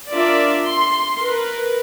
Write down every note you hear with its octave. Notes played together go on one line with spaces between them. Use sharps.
D4 F4 A#4 D5 E5
C6
A#4 B4